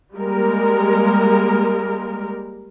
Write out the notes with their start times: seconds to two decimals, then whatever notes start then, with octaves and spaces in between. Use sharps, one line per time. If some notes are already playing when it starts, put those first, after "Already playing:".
0.14 G3 G#3 A#3 A#4